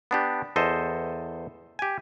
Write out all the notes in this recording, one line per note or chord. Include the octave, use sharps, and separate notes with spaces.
B3 D4 G4
E2 A4 C5 D#5
G4 G#5